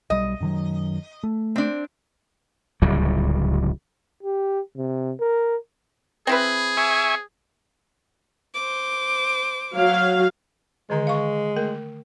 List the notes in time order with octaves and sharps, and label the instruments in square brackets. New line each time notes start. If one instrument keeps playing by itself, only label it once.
[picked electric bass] B1 G3 [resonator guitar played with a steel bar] D#5
[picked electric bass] F#2 D#3 F#3
A3
[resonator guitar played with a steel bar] C4 D4
[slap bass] D1 C#2 F#3 G3
[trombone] G4
C3
A#4
[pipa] C4 E4 B4 [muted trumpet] G#4
[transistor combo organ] E5 G#5 C#6
[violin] C5 D6
[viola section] F#3 F5
[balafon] D3 D#3 [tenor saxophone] G#3
[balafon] F5 C#6
A3 A#4